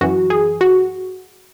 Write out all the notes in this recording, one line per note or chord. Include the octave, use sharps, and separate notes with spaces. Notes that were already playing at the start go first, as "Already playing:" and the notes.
F#2 E3 F#4
G#4
F#4